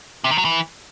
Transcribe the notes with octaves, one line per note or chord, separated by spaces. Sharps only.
C3
D#3
F#3
E3